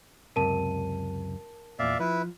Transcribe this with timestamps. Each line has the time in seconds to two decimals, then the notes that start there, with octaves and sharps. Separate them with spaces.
0.36 C#2 F#2 C3 A#4 A5 D#7
1.79 E2 G2 A#2 D5 E5 F5
2.00 F3 E4 B4